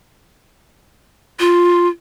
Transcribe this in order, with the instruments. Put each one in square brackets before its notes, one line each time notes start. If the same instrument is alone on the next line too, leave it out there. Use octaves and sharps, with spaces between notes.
[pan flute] F4